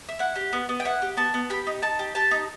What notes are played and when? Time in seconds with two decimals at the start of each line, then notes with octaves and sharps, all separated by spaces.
0.09 E5
0.19 E4 F#5
0.36 G4
0.53 B3
0.69 B3
0.80 G5
0.85 E4 F#5
1.02 G4
1.17 B3 A5
1.34 B3
1.50 G4 B5
1.67 D#4
1.82 D#4 A5
1.99 G4
2.15 G4 A5
2.31 D#4